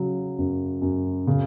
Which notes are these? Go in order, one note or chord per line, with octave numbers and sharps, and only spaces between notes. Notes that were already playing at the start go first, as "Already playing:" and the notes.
Already playing: C#3 F#3
F#2
F#2
C#3